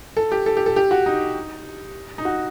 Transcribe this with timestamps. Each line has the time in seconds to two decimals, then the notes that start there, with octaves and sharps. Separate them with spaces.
0.17 A4
0.32 G4
0.46 A4
0.57 G4
0.66 A4
0.76 G4
0.91 F#4
1.06 D#4
2.18 D#4
2.25 F#4